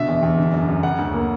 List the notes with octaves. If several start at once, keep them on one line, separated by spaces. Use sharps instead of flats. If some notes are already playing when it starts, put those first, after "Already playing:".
Already playing: B2 D3 E5
E2
E2
D3
F#2
F#2
C#3 F#5
D2
A#3